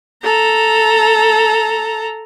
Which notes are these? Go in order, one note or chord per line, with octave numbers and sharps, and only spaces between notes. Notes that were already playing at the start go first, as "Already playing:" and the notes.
A4 A#5